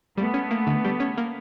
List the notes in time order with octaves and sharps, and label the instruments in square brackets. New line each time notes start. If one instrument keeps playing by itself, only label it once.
[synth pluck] G3 [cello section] A3 B3
[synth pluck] C#4
A#3
D3
G3
C#4
A#3